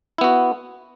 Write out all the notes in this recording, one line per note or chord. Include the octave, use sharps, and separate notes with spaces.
B3 E4 F#4